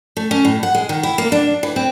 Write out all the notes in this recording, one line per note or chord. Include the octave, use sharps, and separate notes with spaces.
A3
C#4
A2
F#5
G#3
D#3
E4
A#3
D4
E3
C4